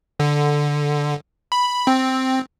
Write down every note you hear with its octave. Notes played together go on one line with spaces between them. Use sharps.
D3
B5
C4